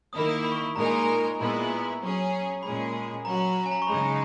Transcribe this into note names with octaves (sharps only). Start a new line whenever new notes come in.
D#3 A#3 E4 A#4 D#6
D#6
B5
C#6
B5
A#2 G#3 D#4 A#4 A#5
G#5
A#5
A#2 G#3 B3 E4
A#5
F#3 C#4 G#4
A#2 G#3 C#4 G#4 B5
F#3 C#4 F#4 A#5
A#5
G#5
A#5
C#6
C#3 G#3 D#4 B5